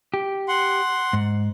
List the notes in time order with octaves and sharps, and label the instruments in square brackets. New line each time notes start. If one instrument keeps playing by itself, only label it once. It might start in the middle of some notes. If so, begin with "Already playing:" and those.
[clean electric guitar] G4
[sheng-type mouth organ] F#5 C6
[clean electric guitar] G#2